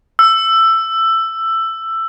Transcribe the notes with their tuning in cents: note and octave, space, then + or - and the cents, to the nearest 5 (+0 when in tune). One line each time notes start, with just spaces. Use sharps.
E6 +15